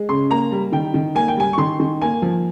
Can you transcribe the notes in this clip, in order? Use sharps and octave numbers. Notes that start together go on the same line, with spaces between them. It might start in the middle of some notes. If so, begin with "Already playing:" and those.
Already playing: G#3
C#3 C6
A#3 A#5
G3
D#3 G5
D#3
A#3 G#5
G5
G3 G#5
C#6
D#3 C6
D#3
A#3 G#5
F3